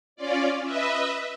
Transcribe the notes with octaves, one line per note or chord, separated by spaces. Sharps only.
C#4 F4 D5
B4 D#5 E5